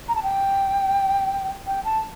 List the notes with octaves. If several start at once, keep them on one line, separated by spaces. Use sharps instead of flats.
A#5
A5
G5
G5
A5